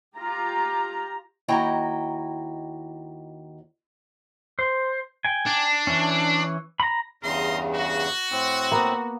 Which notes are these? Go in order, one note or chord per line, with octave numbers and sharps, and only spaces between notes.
F4 G4 A#5
D#2 E4 F#4 D#5 G5 A#5
C5
G5 G#5
D4
E3 C#4
A#5 B5
E2 G2 C#3 A#4 D#5 C6
F#4
A2 C4
A#3 B3